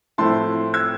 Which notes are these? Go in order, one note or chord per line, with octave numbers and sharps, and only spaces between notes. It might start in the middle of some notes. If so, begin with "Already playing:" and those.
A2 F3 A3 C4 E4 A5 C6
E6 G#6